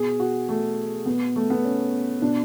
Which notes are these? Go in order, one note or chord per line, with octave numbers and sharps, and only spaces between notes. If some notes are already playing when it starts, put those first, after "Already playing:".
Already playing: B2 G#4
F#4
A3
B2 B3
A3
B3
C#4
B2 D4